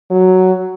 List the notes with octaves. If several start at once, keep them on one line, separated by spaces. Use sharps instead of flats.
F#3